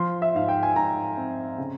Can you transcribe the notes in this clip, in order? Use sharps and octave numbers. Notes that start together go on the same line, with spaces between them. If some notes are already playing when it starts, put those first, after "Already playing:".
Already playing: F3 C6
E5
G#2 F5
G5
G#5
G#2 A#5
C4
C#3